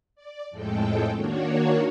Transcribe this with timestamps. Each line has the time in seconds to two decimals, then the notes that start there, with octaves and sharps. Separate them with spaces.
0.16 D5
0.50 F2 A2 G#3 A4 G5
1.14 D#3 A#3 D4 F#4 C#5